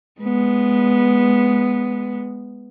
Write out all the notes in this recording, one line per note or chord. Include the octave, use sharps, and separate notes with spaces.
G#3 B3